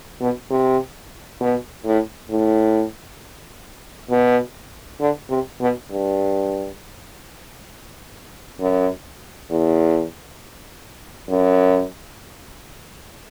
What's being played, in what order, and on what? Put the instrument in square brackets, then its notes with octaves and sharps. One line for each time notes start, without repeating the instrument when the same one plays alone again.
[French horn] B2
C3
B2
A2
A2
B2
D3
C3
B2
G2
F#2
E2
F#2